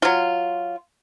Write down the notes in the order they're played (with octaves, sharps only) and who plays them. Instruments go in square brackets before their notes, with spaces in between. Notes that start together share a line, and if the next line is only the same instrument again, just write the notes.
[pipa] F#3 F4